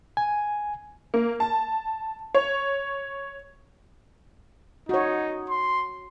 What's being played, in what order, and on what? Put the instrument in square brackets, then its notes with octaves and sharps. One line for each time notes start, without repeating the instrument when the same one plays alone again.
[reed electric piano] G#5
[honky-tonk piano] A#3
A5
C#5
[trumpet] D#4 [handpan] F#4 C#5
[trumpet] C6